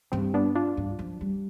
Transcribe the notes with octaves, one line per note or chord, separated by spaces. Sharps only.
G2 C4
B3 D4
D4 F4
G2
F3
G3